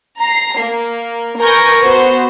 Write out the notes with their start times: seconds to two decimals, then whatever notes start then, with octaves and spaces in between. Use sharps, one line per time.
0.19 A#5 C7
0.57 A#3
1.39 A#4 B4 G#5 C#6 G6 A#6
1.83 B3 F#4 C5